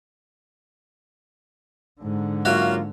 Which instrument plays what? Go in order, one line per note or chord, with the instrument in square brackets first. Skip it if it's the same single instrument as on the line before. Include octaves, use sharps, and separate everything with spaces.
[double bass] G#2 D3
[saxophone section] F#3 A#3 F4 [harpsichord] F#4 C#5 E5